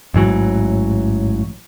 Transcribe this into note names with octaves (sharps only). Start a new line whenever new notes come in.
A1 G#2 E3 F#3